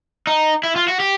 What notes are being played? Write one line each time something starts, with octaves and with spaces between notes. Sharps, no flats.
D#4
E4
F4
F#4
G4